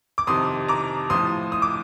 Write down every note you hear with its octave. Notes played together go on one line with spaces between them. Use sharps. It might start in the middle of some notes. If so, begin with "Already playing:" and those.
D6
F2 C3 D#3 C6 D#6
A#5 D6
A2 F3 C6 D#6
D#6
D6